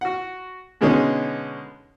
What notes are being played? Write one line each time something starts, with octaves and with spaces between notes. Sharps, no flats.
F#4 F#5
B2 D3 G#3 B3 C#4 D#4